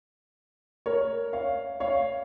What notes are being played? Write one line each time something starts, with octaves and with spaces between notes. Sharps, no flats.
A#4 C#5
C#5 F5
C#5 F5